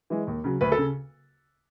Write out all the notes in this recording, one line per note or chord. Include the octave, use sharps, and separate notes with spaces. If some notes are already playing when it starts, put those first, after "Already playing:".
E3 G#3
D#2
C#3 F#3
D2 B4
A4
C#3